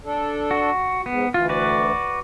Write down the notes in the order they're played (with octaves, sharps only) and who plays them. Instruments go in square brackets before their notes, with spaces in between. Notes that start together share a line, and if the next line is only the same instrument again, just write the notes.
[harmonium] D4 A4
[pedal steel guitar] F#4
[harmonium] G#2 [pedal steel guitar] B3
[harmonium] D2 E3 [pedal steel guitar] F4
[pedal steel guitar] F#4 B4 D5